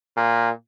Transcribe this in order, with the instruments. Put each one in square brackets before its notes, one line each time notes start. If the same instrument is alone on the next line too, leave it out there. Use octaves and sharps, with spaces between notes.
[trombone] A#2